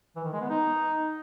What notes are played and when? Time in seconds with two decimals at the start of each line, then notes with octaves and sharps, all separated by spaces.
0.16 E3
0.24 D#3
0.33 G#3
0.41 B3
0.50 D#4